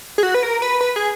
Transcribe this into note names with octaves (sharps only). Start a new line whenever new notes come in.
G#4
F#4
B4
A#4
B4
B4
G#4